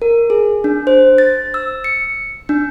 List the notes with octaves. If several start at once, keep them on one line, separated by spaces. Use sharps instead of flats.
A#4
G#4
D4
C5
A6
E6
C#7
D4